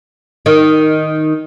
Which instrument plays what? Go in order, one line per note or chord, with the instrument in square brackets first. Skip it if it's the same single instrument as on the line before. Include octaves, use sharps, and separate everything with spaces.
[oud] D#3